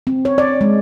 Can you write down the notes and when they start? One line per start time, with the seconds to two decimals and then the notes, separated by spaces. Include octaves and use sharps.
0.07 C4
0.25 C#5
0.38 D5
0.61 G#3